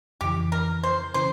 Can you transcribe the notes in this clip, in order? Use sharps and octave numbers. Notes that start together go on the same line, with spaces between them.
F2 C#3 E3 G4
A#4
C5
C#3 E3 C5